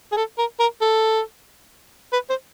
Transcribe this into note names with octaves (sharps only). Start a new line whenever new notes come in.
G#4
A4
A#4
A#4
A4
B4
C5